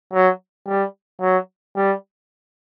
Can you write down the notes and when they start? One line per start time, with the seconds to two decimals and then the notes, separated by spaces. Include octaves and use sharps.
0.13 F#3
0.67 G3
1.21 F#3
1.76 G3